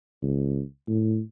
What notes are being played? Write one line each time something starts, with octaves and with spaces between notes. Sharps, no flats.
C#2
A2